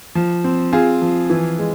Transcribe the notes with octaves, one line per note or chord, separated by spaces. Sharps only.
F3
C4
C4 F4 G#4
F3
E3
G#3